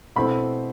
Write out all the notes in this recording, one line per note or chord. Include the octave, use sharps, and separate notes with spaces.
B2 A3 C4 E4 B5